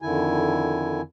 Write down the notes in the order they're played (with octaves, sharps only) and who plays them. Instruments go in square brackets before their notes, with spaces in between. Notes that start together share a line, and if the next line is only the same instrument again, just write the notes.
[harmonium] F2 D3 D#3 E4 G#5